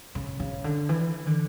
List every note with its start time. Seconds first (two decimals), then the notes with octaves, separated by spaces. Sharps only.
0.15 C#3
0.40 C#3
0.64 D3
0.89 E3
1.27 D3